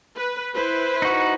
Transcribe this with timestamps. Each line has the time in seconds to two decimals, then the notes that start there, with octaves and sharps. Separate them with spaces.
0.16 B4
0.54 E4 B4 C5
1.02 D#4 F#4